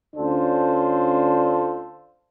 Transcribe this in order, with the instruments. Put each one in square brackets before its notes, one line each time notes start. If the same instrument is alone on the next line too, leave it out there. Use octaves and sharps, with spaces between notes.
[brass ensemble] D2 C#4 D4 F4 A4 C5